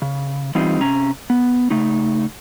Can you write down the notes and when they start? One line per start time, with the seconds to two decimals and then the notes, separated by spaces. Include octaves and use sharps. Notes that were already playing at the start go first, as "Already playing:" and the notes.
0.02 C#3
0.55 E3 G3 C4 D#4 F4
0.81 C3 C#4 A#5
1.30 B3
1.70 C#3 A3 D#4